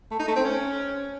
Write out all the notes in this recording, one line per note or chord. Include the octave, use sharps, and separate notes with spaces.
A3
D#4
A3
C4
C#4